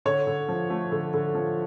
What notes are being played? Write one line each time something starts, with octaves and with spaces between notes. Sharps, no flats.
D3 C#5
D3
F3
A3
D3
D3
F3